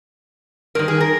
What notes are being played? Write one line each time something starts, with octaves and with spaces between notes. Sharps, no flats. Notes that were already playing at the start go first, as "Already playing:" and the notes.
G2 D#3 A#4
G#4
A#4